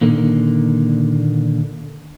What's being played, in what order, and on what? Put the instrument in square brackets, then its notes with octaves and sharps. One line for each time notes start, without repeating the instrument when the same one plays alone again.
[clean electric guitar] A#2 D3 D#3 A#3